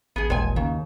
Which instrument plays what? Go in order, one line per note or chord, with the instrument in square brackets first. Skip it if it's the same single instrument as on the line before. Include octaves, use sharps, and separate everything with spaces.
[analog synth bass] A1 [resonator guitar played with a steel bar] B3 G#4
[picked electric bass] D#1 [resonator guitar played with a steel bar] G#3 G#5
[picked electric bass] D#2 [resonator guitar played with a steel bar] C#3